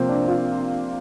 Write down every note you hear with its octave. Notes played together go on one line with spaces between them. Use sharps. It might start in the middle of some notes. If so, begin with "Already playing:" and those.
Already playing: C3 F3 A#3 C4
D4
F4